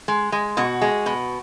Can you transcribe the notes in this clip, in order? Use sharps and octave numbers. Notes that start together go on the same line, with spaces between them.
G#3
G#3
B2 F#4
G#3
B2